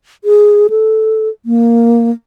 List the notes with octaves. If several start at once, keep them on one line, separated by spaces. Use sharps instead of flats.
G#4
A4
A#3